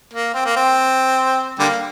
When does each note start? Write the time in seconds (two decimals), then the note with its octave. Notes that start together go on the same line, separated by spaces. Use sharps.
0.13 A#3
0.34 C4
0.45 A#3
0.57 C4
1.59 D3 G3 A#3